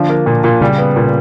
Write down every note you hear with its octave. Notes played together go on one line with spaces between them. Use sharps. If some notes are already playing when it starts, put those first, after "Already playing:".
Already playing: D3 F3 D4
A#3
A#2
A#2
C#3 G3
B3
A#2